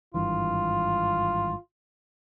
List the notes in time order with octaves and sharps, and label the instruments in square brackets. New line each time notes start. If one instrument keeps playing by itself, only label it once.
[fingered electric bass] G#1 G2 E3 [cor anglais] F4